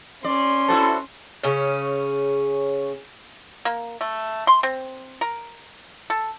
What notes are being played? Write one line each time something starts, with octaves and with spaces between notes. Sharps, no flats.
C#4 D5 C6
E4 F#4 A4 C5
C#3 C#4
A#3
A3
C6
C4
A#4
A4